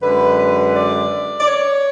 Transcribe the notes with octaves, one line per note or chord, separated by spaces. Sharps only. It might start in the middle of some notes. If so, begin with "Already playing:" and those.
F#2 D3 G#3 B4
B4
D5
D5
C#5